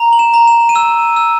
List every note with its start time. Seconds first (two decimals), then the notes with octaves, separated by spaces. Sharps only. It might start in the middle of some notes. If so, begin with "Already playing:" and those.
Already playing: A#5
0.13 F#7
0.19 E7
0.34 A#5
0.48 E7
0.69 D#7
0.75 E6 E7
1.16 E6